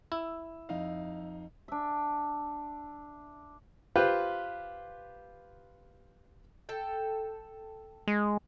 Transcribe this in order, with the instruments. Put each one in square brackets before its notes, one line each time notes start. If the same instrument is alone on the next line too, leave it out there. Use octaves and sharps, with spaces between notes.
[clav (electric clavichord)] E4 [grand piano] E6
[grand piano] F2 D#4 F5
[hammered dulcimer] D4 E5
[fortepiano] F4 G4 B4 C5
[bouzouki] A4 G5
[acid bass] G#3